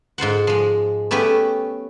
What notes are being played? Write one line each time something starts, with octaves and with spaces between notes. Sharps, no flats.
G#2 F4 C5 F#5
F3 G#3
A3 B3 C#4 G4 B4